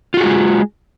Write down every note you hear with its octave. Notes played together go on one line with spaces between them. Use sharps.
G#3 F4 F#4 G#4